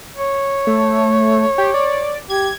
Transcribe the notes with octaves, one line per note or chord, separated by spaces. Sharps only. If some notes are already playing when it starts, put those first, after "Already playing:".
C#5
A3
G4
D5
G4 G#6